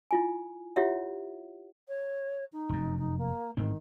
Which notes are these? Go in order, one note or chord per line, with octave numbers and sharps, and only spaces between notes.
E4 F4 G#5
E4 F4 G4 C#5 E5 F#5
C#5
D#4
F1 F#2
D#4
A#3
A1 G#2 D#3 C4